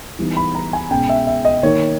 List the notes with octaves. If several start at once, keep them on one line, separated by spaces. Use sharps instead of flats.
E3 G3 B3 D#4
B5
A#5
G#5
B2 G#3 C#4 G5
E5
E5
D#5
D#3 A#3 D#4 C#5